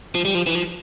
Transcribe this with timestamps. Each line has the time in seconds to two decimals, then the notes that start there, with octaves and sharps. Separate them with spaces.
0.15 F3
0.25 G3
0.35 F3
0.47 E3
0.55 F3